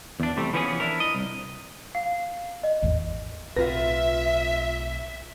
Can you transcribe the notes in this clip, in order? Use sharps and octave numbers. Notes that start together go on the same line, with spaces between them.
E2 D4
C3 G3 A3
E3 F3 B3 C#4 E4 G#4
D4 E4 A#4
D#5
C2
F5
D#5
G#1 E2
B1 A2 C4 F4 B4 E5 A#6